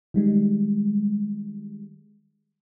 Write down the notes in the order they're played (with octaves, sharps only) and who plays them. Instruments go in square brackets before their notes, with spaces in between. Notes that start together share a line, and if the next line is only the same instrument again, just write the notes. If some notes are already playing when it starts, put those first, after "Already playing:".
[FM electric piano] D#3 G3 G#3